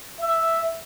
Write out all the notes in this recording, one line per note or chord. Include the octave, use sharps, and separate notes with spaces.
E5